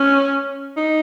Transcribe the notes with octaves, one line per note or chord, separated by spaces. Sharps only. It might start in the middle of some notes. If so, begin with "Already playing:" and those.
Already playing: C#4
D#4